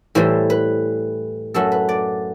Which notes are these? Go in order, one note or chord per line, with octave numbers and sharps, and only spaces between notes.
A2 E3 G3 C5
B4
F#2 F#3 A3 A4
B4
D5